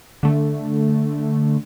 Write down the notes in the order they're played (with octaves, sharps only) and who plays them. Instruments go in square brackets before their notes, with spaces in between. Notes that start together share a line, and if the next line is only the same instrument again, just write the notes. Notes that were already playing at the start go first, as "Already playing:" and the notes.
[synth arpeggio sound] D3 A3